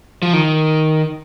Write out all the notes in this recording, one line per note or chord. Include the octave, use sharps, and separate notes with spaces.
F3
D#3